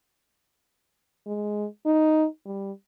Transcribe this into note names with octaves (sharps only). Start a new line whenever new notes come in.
G#3
D#4
G3